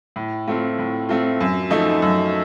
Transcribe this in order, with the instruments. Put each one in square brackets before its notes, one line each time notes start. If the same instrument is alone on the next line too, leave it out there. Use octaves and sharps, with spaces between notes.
[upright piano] A2
A3 C4 F4
A2
A3 C4 F4
F#2
F3 A3 D#4
F#2